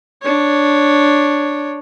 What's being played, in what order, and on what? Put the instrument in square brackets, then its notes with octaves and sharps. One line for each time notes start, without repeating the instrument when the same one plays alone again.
[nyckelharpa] D4 C#5